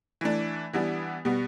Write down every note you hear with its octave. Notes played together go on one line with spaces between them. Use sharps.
E3 A3 D4
E3 G3 B3 D4
B2 G3 B3